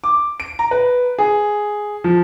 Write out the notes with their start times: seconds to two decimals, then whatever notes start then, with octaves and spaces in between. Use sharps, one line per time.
0.04 D6
0.40 D7
0.59 A#5
0.71 B4
1.19 G#4
2.04 F3